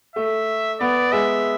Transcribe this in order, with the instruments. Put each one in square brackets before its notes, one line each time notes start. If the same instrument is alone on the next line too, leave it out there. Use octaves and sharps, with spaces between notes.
[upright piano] A3 [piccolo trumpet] E5
[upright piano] B3 [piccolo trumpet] D5
[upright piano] G#3 [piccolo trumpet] E5